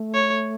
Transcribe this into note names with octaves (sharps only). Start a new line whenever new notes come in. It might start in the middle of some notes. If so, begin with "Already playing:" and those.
Already playing: A3
C#5